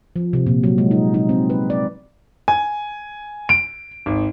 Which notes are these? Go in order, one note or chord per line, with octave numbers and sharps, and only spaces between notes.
F3
C3
A#2
F#3
G#3
D#4
D#4
C4
B4
D5
G#5
D7
G#1